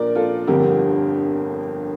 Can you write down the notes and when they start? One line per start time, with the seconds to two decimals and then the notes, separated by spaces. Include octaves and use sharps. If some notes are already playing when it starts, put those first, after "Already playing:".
Already playing: A#1 A#2 A#4 D5
0.15 F4 A4
0.47 G1 F2 D3 G4 A#4